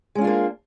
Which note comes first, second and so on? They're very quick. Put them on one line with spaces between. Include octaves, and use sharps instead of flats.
G#3 C#4 F4 D4 A#3